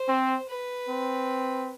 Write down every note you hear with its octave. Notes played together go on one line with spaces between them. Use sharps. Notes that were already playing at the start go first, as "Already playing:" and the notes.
Already playing: C5
C4
B4
C4